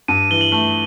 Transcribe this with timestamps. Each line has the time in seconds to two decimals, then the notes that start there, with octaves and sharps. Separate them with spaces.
0.08 G2 D#7
0.30 E3 G7
0.41 F#7
0.52 A3